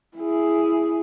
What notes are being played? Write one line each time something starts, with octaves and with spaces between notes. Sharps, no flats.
E4 G#4